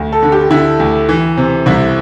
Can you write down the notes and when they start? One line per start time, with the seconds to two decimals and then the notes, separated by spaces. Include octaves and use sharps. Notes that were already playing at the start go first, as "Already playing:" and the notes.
Already playing: D2
0.13 A4
0.23 D3
0.32 G4
0.51 D3 E4
0.80 D2
1.09 E3
1.37 C3
1.66 C2 E4